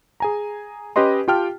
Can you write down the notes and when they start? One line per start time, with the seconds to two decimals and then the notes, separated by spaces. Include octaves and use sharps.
0.20 G#4 G#5 A#5
0.96 C#4 G4 B4 D#5 C6
1.28 F4 G4 G5 A5 F6